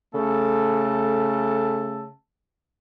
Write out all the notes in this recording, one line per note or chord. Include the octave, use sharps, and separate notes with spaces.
C#3 A3 A4